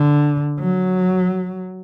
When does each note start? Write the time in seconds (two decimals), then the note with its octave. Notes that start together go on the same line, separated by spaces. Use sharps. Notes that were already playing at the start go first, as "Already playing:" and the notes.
Already playing: D3
0.59 F#3